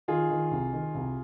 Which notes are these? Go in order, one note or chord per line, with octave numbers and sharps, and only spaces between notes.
D#3 F4 G#4
D#3
C2
D#3
C2